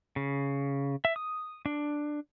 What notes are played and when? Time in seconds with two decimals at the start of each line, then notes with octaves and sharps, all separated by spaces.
0.16 C#3
1.05 E5
1.16 D#6
1.66 D4